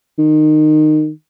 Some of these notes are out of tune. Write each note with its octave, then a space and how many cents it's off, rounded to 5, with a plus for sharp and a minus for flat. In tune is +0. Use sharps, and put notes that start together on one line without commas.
D#3 -20